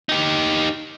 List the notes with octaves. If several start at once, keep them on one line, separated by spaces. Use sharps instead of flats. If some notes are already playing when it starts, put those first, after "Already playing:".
D#4 G4